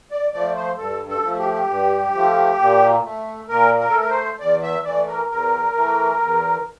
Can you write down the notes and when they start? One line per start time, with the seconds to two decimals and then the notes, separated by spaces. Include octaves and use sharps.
0.11 D5
0.33 F3 A3 D5
0.56 C5
0.78 G2 A4
1.09 A4
1.23 F3 A3
1.39 G4
1.69 G2
2.14 F3 A3
2.60 A#2
3.05 A3
3.49 A#2 A#4
3.79 A#4
3.90 A3 A4
4.00 A#4
4.09 C5
4.39 E2 D5
4.63 E5
4.85 E3 A3 D5
5.08 A#4
5.30 E2 A#4
5.76 E3 A3
6.21 E2